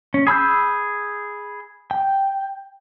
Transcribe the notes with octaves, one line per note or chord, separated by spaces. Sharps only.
C#4
G#4 B5 E6 G6
G5